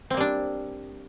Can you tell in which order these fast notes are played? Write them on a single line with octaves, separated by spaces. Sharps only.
C4 A#3 G3 D4